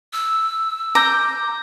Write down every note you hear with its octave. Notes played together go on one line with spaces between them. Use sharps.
E6
A#5 D6 G6